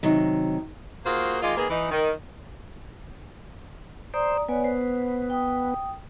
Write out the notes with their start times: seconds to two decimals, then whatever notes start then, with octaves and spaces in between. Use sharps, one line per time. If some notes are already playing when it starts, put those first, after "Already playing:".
0.03 C3 D#3 F#3
1.05 A#3 F4 F#4 G#4 A#4 C5
1.42 D#3 G#3 F4 D5 D#5
1.56 D#3 A#3 B3 G#4
1.69 E3 D#4
1.91 D#3
4.14 C5 D5 A#5 D#6
4.49 B3 C#5 D5 G#5
4.64 C5
5.30 G5 D#6